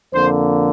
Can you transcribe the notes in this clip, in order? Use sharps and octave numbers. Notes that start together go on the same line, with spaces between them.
F2 D3 A#3 C5